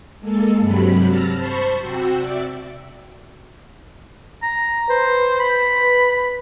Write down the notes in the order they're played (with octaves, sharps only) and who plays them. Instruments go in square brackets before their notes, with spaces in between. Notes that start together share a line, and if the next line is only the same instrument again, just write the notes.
[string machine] G#3 A#3 A4
G2 C3 F#3 B5
A5 E6 F6 A#6
C5 A5 B5 C#6
C3 F#4 G5 E6
D5 E5
[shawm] A#5
[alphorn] B4 [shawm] C5
[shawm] B5